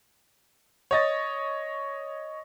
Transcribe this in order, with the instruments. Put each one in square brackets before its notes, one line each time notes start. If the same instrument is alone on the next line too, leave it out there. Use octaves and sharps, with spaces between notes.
[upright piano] C#5 D#5 A6